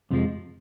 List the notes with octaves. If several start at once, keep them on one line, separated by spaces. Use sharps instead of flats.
F2 C3 F3 G#3